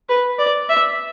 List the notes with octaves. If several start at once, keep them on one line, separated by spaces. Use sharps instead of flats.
B4
D5
E5